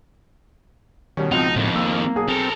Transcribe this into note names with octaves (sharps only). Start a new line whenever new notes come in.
B2 D#3 G3 C#4
C#2 B2 F3 C4 D#4
F2 A2 D#3
A#3 E6
B1 G#4 D#6
C4 A4 A#4